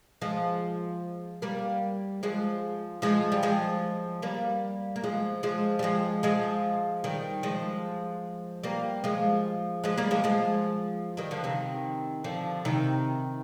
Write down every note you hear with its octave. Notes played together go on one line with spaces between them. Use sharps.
F3 G#3
G3 A#3
F3 G#3
F3 G#3
G3
F3 G#3
G3 A#3
A#3
F3 G#3
F3 G#3
G3
F3 G#3
F3 G#3
D#3 G3
F3 G#3
G3 A#3
F3 G#3
F3 G#3
G3 A#3
F3 G#3
F3 G#3
D#3 G3
D3 F3
C3 D#3
D3 F3
C3 D#3